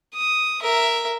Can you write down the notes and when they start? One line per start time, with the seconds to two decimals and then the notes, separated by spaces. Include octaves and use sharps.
0.14 D#6
0.62 A#4 E5